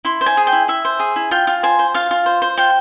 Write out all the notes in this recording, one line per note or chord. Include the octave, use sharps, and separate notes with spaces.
E4 C6
C5
G#5
G#4
G5
E4
E4 E5
C5
G#4
E4
F4 G5
F4
C5 G#5
C5
F4 F5
F4
C5
C5
F4 G5